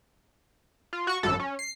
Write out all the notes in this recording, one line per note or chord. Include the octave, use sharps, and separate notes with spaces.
F4
F#4 C#6
G#1 F#2 A4
C#4
C7